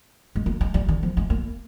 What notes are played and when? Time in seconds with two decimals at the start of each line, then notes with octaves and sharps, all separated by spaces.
0.35 G#3
0.46 A#3
0.61 G#3
0.74 G3
0.89 D#3
1.03 F3
1.17 G#3
1.30 A#3